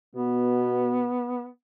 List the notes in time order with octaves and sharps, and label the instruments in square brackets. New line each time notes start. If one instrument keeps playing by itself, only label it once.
[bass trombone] B2 [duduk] B3